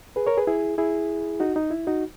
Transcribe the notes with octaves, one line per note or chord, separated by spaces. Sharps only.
G#4 B4
A#4 C#5
G#4 B4
E4 G#4
E4 G#4
D#4 F#4
D#4
E4
D#4 F#4